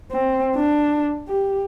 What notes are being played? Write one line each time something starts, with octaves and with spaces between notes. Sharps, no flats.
C4
D4
G4